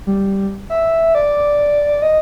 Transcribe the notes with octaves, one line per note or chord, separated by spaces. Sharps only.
G3
E5
D5
D#5